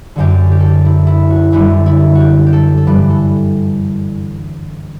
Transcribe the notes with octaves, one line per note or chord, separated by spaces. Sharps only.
F#2 D3 F#3 G4
G4
A4
G4
E4
E4
F#4
F#2 D3 G3 E4
E4
F#4 G4
G4
A4
A4
G2 E3 G3 B4
A4